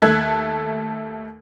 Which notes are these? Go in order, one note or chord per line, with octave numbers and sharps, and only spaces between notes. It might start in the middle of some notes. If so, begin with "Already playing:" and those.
D#2 A3 A4 E6 F#6 G#6